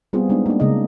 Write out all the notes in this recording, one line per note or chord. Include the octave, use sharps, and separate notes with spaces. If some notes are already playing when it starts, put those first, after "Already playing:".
G3 B3 C4 F4 G#4
G#3 B3 D4 D#4
A#3 D4
C#3 G#3 D#4 D#5